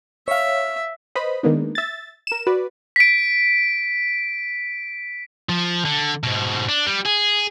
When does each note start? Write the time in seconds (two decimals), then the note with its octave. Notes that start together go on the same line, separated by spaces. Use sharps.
0.28 C#5 E5 F5
1.15 B4 C5 D#5 B5
1.43 D#3 G#3 A#3 B3 D4 D#4
1.75 E5 A6
2.27 A#4 E7
2.47 F#4 B4 D5
2.96 B6 D7
5.49 F3
5.85 D3
6.23 G#2 B2
6.69 D4
6.86 G3
7.05 G#4